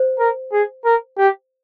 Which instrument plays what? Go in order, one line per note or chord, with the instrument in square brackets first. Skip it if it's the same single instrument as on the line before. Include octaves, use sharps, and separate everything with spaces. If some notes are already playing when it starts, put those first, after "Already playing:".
Already playing: [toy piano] C5
[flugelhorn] A#4
G#4
A#4
G4